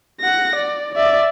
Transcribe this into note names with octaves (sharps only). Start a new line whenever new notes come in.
F#5 A#6
D5
D5 E5